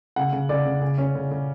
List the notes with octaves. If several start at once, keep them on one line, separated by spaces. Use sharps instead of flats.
C#3 F#5
C#3
C#3 D5
C#3
C#3
C#4
C#3
C#3